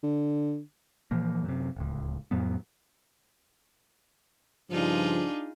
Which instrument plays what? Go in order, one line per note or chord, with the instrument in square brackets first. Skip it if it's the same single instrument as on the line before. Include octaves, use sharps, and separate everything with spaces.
[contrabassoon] D3
[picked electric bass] A#2 E3 F3 A#3
F#2 C3
D1 C#2
F2 A2 F#3 B3
[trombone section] G2 C#3 F3 [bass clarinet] D4 [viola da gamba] D#4 F4 G#4